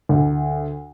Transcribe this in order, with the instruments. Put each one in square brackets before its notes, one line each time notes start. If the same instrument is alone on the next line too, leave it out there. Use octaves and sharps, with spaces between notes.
[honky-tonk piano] D2